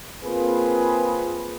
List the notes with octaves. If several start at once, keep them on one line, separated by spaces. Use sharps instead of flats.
A#3 C4 F4 G#4 B4